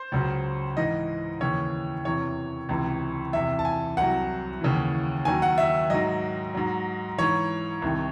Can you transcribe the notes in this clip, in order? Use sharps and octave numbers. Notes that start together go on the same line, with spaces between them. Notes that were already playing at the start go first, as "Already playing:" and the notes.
Already playing: C5
C#2 C#3 F#3
G#2 E3 D#5
D#2 C#3 E3 C#5
E2 C3 E3 C#5
C#2 C3 E3
E2 C3 E3 E5
A5
G#5
C2 C3 F#3 F#5
D#2 C#3 E3
D#2 D#3 F#3 G#5
F#5
E5
G#2 F#3 D#5
G#2 F#3
G#2 E3 C#5
C2 C3 D#3